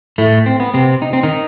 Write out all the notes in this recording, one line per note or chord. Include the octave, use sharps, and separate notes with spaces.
A2 A3
C4
B3
C3 C4
D#4
C4
D#3 D#4